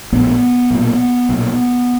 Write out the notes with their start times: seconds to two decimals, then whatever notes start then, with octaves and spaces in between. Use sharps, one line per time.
0.12 A#1 A2 B3
0.70 B1 A#2
1.29 B1 A#2